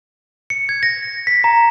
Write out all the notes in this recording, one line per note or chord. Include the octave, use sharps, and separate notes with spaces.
C#7
G#6
A#6
B6
A#5